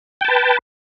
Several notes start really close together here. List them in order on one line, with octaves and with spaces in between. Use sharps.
G5 A5 B4